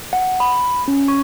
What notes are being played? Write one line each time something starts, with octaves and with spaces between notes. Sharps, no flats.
F#5
B5
C#4
C#6